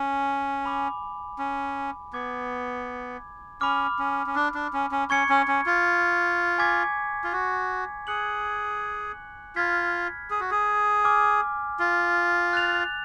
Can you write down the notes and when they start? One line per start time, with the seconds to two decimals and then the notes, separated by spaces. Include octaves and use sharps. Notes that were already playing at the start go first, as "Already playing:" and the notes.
Already playing: C#4
0.64 G#5 B5 D6
1.38 C#4
2.13 B3 B5 D6 G#6
3.61 C#4 B5 D6 F6
3.99 C#4
4.26 C#4
4.35 D4
4.54 D4
4.73 C#4
4.91 C#4
5.10 C#4 C#6 G#6 C#7
5.29 C#4
5.48 C#4
5.66 F4
6.58 G#5 D6 G#6 B6
7.24 F4
7.32 F#4
8.07 G#4 F#6 C#7 F#7
9.56 F4 B5 F6 G#6 B6
10.30 G#4
10.40 F#4
10.51 G#4
11.04 G#5 D6 F6
11.79 F4
12.53 F#6 A6 F7